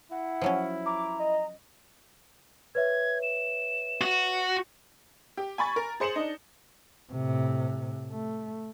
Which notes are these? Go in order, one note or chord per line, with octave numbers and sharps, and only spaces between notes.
E4 F#5
F3 F#3 C#4
A#5 D6
D#5
B4 C#5 E5 G#6
E7
F#4
G4
G#5 B5 C#6 A6
A#4
G#4 C5 C#7 E7 F#7
D4 D#4
A2 C3
A3